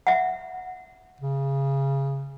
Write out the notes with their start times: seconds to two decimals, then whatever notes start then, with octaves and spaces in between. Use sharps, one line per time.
0.07 E5 F#5
1.21 C#3